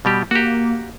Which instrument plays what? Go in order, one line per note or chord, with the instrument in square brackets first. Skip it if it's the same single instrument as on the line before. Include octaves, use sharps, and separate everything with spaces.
[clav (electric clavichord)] B2 G3 G4
[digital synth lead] A#3 [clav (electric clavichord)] F#4 G4